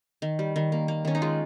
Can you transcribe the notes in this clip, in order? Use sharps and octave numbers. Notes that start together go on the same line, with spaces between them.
D#3
G3
D#3
A#3
A#3
D#3 C#4
D#4
G#3 F4